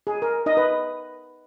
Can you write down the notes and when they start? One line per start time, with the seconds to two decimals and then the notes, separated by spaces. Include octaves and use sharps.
0.07 G#4
0.22 A#4
0.46 D#4 D#5
0.57 B4